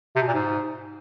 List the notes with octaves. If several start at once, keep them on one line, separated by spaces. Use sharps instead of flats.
C3
B2
A#2
G#2